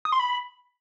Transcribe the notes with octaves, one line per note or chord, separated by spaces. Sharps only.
D#6
C6
B5